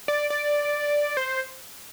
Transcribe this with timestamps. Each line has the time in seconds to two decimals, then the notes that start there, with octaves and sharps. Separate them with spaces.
0.08 D5
0.30 D5
1.17 C5